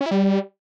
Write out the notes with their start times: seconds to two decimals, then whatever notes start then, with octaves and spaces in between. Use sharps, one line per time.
0.01 C#4
0.06 E4
0.11 G3